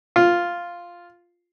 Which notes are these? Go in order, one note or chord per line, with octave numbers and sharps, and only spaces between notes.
F4